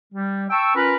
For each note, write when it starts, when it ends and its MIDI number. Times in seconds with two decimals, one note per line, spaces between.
0.13 0.45 55
0.50 0.75 79
0.50 0.75 81
0.50 0.75 85
0.50 0.75 88
0.75 0.95 61
0.75 0.95 65
0.75 0.95 70
0.75 0.95 71